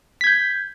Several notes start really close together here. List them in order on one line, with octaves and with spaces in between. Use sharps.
B6 G#6 G6